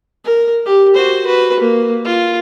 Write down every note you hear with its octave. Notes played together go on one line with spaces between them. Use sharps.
A#4
G4
F#4 C5
F#4 B4
A#3
F4